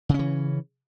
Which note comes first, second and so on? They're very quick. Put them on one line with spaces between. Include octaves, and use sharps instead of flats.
C#3 C#4 E3